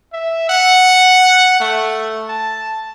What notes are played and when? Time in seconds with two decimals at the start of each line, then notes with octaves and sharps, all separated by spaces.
0.13 E5
0.49 F#5
1.60 A3
2.28 A5